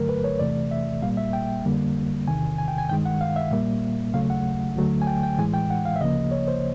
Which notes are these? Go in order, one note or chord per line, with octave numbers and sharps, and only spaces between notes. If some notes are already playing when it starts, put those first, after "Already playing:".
Already playing: G2 D3 F#3 A3 A#4
B4
C#5
E2 C3 E3 A3 D5
E5
A#2 G3 A#3 F5
E5
G5
F2 D3 G3 A#3
E2 C3 D#3 G#5
G#5
G5
G#5
G2 D#3 G#3 G5
F#5
F5
E5
A#2 G3 A#3
D#2 C#3 F#3 A3 F5
F#5
D2 D3 F#3 A3
G#5
G5
G5
A2 E3 G#3 G#5
G5
F#5
F5
E5
D2 C#3 F3 A#3 D#5
C#5
C5